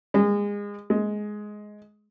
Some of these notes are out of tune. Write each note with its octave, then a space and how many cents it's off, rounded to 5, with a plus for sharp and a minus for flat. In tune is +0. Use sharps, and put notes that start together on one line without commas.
G#3 -25
G#3 +10